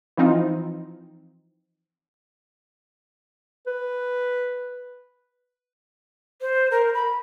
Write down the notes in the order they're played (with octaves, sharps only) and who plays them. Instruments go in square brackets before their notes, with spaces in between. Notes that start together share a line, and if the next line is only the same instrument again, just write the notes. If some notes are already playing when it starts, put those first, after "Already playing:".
[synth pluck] E3 F3 C4 D#4 F4
[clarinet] B4
[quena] C5
A#4
B5